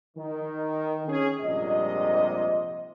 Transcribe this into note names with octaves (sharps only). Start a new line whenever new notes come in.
D#3
C#4 G#4
A#1 F2 G#2 C3 G3 D#5